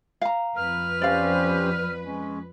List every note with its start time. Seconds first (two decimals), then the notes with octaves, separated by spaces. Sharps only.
0.22 F5 A#5
0.56 F2 B4 F6
1.02 C#4 G4 C5 D5 F5
2.05 G#3 C#4